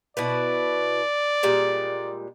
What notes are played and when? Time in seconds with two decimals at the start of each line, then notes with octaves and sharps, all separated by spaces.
0.17 B2 E4 B4 D5
1.43 A#2 G3 G#3